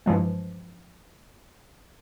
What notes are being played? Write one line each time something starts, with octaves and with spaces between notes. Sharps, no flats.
G2 E3 F3 G#3